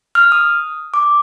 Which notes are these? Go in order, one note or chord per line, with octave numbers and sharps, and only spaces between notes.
F6
D#6
D6